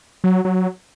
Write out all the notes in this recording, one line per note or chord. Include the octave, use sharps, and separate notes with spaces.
F#3
F#3